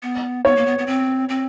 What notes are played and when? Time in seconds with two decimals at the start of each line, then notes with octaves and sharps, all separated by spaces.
0.03 B3
0.45 B3 C#5
0.56 A#3
0.66 B3
0.79 B3
0.87 C4
1.29 C4